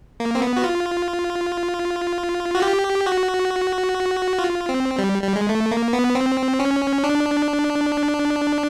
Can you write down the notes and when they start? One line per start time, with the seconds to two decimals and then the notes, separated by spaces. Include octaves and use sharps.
0.20 A#3
0.35 C4
0.42 B3
0.57 F#4
0.64 F4
2.55 F#4
2.62 G4
3.06 F#4
4.39 F4
4.69 C4
4.98 G3
5.22 G3
5.36 G#3
5.49 A3
5.71 A#3
5.93 B3
6.15 C4
6.60 C#4
7.04 D4